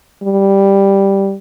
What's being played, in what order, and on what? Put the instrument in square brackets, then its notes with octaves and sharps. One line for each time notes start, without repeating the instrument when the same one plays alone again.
[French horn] G3